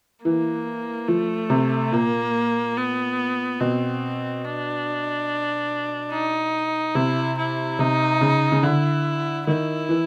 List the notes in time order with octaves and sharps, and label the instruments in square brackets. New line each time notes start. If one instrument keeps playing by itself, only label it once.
[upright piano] E3 [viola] A#3
[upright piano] F3 [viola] A3
[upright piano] C3
[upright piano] A#2 [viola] A#3
[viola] B3
[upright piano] B2 [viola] C4
[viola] D4
D#4
[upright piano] C3 [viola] E4
[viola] E4
[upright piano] C3 [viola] D#4
[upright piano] C#3
C#3
[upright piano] D3 [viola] E4
[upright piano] D#3 [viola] E4
[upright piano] E3